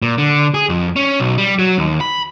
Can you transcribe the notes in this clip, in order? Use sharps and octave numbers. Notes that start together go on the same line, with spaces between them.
A#2
D3
G#4
F2
C#4
B1
G3
F#3
D#2
B5